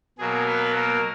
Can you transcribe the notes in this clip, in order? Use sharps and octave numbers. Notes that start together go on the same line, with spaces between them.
B2 F#3 A#3 G#4
B3 B4
A#3 A#4